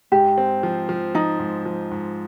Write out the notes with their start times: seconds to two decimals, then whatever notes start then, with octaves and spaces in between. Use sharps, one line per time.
0.12 G#2 G4
0.38 C4
0.63 F3
0.89 F3
1.15 F3 D#4
1.40 G#2
1.65 F3
1.91 G#2